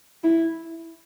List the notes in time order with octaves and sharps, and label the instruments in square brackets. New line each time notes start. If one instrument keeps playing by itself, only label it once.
[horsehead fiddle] E4